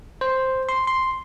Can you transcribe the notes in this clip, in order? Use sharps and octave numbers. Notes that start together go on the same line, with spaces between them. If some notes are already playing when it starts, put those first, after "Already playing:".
C5
C6
C6